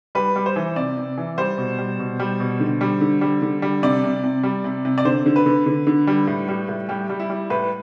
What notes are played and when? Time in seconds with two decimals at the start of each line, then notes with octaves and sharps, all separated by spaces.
0.15 G3 B4
0.36 G3
0.46 C5
0.56 E3
0.76 C3 D5
0.97 C3
1.18 E3
1.38 G3 C5
1.58 B2
1.78 G3
1.99 B2
2.20 G3
2.40 B2
2.60 D3
2.81 G3
3.01 D3
3.21 G3
3.42 D3
3.62 G3
3.83 C3 D5
4.04 C3
4.23 C3
4.43 G3
4.64 C3
4.85 C3
4.98 D5
5.05 D3 C5
5.26 D3
5.36 B4
5.46 D3
5.66 D3
5.87 D3
6.07 G3
6.28 A2
6.48 G3
6.69 A2
6.89 G3 G4
7.10 G3
7.20 E4
7.30 G3
7.50 A2 B4